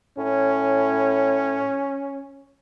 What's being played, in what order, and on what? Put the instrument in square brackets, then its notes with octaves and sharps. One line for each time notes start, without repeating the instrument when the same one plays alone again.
[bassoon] A2 [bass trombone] C#4